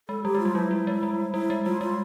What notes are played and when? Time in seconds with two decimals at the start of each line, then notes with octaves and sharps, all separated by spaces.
0.09 G#3 A4
0.24 G3 G4
0.35 G#3 F4
0.45 G3
0.55 F#3 E4
0.71 G3
0.87 G#3
1.03 G3
1.34 G3 E4
1.50 G#3
1.66 G3 F4
1.81 G#3 F4